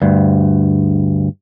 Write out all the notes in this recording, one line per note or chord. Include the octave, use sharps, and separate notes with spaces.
D2 G2